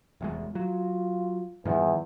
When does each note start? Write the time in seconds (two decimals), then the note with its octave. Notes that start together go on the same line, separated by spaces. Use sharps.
0.21 F1 E2 G#3
0.55 F#3 F4
1.65 E2 G2 D#3 F3